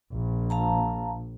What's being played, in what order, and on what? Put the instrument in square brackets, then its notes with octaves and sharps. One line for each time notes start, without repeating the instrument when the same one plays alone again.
[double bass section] A#1
[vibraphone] F5 A5 A#5